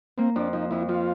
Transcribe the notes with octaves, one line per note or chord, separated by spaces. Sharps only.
A#3 C4
F2 D4
F3 D#4
F2 E4
F3 F4